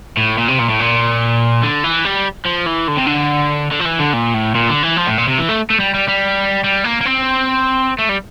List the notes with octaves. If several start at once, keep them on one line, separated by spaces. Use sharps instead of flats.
A2
A#2
C3
A#2
A2
A#2
D3
E3
G3
F3
E3
D3
C3
D3
D3
F3
E3
D3
A#2
A2
A#2
D3
E3
F3
A2
A#2
C3
E3
A3
A3
G3
G3
G3
G3
A#3
A#3
C4
A3
G3